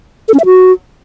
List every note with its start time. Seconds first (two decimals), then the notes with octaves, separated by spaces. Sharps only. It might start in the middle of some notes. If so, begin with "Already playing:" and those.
0.28 A4
0.34 C#4
0.40 E5
0.45 F#4